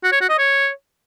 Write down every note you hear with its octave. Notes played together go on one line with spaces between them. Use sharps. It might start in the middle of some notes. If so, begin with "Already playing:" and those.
F#4
C#5
F#4
D#5
C#5